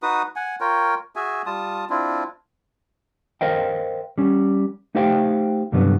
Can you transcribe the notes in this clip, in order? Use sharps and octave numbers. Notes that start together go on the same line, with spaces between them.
D#4 F#4 B4 D#6
F#5 G#5
F4 A#4 C#5 G5
F#4 G#4 E5 G#5
G3 F4 A5 D#6
C4 D4 E4 F4
A#4 C5 D#5 F5 G5
G3 C#4
A3 D#4 G4 C5 F5 G5
C2 G2 D3 F#3 G3 B3